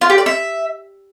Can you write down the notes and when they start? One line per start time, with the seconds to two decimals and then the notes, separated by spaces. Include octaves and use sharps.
0.01 F4
0.10 G4
0.18 D5
0.26 E5